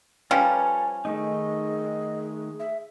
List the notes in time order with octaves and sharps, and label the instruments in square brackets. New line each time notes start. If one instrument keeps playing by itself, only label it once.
[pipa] F3 G3 C#4 [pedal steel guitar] F4 A4 A#5 [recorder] B4 [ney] G#5
[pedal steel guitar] D#3 A3 D#4 [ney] G#4 [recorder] D#5
[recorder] E5